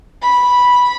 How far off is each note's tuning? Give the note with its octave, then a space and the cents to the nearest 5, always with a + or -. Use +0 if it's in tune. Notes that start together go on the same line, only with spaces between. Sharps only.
B5 -10